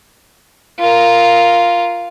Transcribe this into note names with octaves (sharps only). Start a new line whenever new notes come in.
F4 A#4